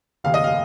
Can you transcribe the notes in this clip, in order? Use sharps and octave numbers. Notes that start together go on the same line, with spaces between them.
F1 D#2 C#3 F5
D#5
F5